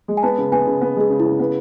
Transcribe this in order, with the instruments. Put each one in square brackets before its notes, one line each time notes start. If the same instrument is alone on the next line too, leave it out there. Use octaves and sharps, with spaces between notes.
[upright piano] G#3
[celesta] G#5
[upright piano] B3 [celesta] A5
[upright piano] C#3
[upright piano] B3 [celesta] G#5
[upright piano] C#3
B3
[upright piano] G#3 [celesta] G#4
[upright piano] C#3
[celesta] E4
[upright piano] C#3
B3